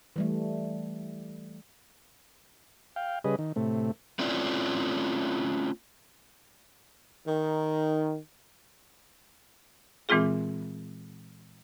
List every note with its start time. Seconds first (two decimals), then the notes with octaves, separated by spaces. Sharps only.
0.16 E3 G3 A3
2.96 F5 G5
3.24 C#3 G3 G#4 B4 D#5
3.39 D#3
3.56 A2 C3 A3
4.19 A3 C4 C#4 E4 F4 D5
7.27 D#3
10.09 A#2 E3 G#3 C4 F4 G#4